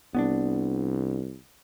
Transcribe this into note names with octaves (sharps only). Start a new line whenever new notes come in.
C2 B3 C#4 D4